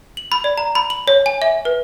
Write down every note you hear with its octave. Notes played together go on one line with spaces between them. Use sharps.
F#7
B5
D5
A#5
B5
F#7
C#5
G#5
E5
B4